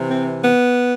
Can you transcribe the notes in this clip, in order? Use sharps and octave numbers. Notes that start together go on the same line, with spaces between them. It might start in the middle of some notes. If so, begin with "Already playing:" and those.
Already playing: C3 E3
C4
B3